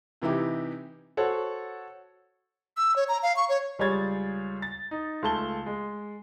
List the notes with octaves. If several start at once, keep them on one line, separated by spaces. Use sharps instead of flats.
C3 E3 D#4 E4 G4
F#4 A4 C5 C#5 F#5
E6
C#5
A#5
F5
C#6
C#5
C#2 G3 G#4 C#5 G#6 A6
A6
D#4
C#2 A3 A5 G7
G#3